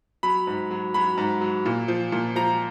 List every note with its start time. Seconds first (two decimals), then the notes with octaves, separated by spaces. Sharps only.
0.23 F#3 B5
0.47 G#2
0.71 F#3
0.94 F#3 B5
1.17 G#2
1.41 F#3
1.66 A#2
1.88 F3
2.12 A#2
2.36 F3 A#5